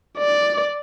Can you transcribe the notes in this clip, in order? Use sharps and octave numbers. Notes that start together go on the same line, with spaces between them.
D5